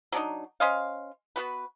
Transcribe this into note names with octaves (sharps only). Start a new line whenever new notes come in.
F#3 D4 D#4
C#4 C5 D#5 F5
B3 F#4 B4